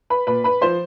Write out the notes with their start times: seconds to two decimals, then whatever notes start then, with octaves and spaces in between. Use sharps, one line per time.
0.10 B4 B5
0.27 A#2 B4 B5
0.44 B4 B5
0.62 F3 C5 C6